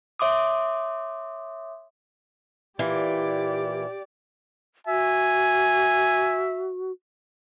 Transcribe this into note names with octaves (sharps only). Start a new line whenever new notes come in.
C#5 E5 C6 D6 D#6
A#2 E3 G4 D5
F#4 E5 G#5